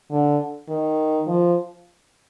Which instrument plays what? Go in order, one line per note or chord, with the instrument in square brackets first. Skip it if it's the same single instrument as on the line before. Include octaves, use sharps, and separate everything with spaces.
[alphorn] D3
D#3
F3